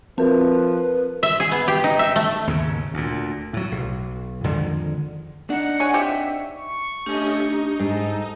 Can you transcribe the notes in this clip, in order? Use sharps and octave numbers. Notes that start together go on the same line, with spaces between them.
F3 C4 A#4 B4
E5
G#4
B3
G4
D#4
E5
A3
D#2 G#2 C#3
D2 A#2
A2 F#3
B1
F2 D3 D#3 G#3
D4 D#4 F#5
G#4 C#5
C4 G4 E5
C#6
A3 C#4 D4 G4 D#5
D#4
G#2 A4